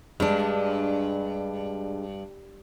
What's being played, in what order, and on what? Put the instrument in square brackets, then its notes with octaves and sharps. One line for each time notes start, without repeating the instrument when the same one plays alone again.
[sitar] G2 [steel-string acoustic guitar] G#3 D4